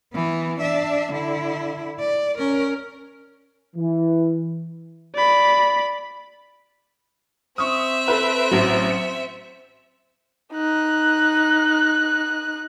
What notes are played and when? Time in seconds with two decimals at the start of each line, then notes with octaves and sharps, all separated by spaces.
0.13 E3 B3
0.61 D4 E5
1.13 D3 E4
2.00 D5
2.38 C#4 A#4
3.75 E3
5.15 D5 B5
7.58 C4 E5 C#6 D#6
8.08 A4 B4
8.51 A1 F#3
8.90 C#7
10.53 D#4 F#6